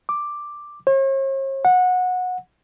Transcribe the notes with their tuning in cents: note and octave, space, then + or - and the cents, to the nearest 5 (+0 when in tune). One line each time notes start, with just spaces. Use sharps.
D6 +5
C#5 -45
F#5 -20